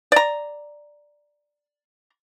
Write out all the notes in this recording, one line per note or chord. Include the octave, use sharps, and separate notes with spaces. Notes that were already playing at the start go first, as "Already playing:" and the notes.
D5 A#5